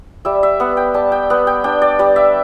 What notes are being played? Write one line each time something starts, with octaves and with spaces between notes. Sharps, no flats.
G3 E5
E5
B3 F#5
G5
G3 A5
G5
B3 F#5
G5
D4 G5
D5
G3 D5
E5